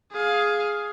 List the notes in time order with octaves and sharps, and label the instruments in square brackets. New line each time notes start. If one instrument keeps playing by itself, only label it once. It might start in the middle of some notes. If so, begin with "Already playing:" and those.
[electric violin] G#4 F5